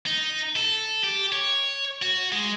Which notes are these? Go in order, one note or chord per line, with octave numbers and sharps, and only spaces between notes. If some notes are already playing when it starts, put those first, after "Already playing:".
D#4
A4
G4
C#5
F#4
G#3